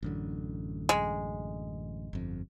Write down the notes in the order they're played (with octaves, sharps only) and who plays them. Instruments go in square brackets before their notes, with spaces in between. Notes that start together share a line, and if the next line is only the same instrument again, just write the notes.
[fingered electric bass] A1 F#2 D3
[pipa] G#3
[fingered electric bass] G1 F2